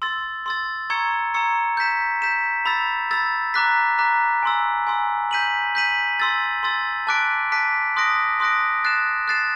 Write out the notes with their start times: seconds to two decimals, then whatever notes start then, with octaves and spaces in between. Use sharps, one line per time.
0.02 C6 E6 A6
0.46 C6 E6 A6
0.90 A#5 C#6 E6 G#6 C#7
1.34 A#5 C#6 E6 G#6 C#7
1.77 G6 B6 E7
2.22 G6 B6 E7
2.66 B5 E6 A6
3.11 B5 E6 A6
3.54 A#5 D6 F#6 B6
3.98 A#5 D6 F#6 B6
4.43 G#5 C6 E6
4.87 G#5 C6 E6
5.31 G6 B6 D#7 F#7
5.75 G6 B6 D#7 F#7
6.20 C6 E6 A6
6.63 C6 E6 A6
7.07 A5 D6 F#6 B6 D7
7.51 A5 D6 F#6 B6 D7
7.96 C6 D#6 F#6 A#6 D7
8.40 C6 D#6 F#6 A#6 D7
8.84 F#6 A6 C7 E7
9.28 F#6 A6 C7 E7